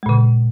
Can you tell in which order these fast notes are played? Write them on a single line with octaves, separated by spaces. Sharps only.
G#3 A#2 C#3